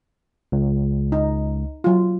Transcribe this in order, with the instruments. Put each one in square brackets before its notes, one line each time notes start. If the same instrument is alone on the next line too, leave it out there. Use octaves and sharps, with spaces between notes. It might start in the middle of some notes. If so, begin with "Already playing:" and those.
[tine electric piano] C#2
[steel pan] D#4
F#3 F4